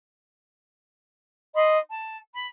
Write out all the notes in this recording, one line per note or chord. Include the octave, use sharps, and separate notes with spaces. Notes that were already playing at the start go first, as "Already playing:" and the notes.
D#5 B5 C6
A5
B5